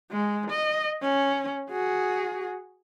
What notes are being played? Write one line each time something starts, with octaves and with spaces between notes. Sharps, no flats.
G#3
D#5
C#4
F#4 G#4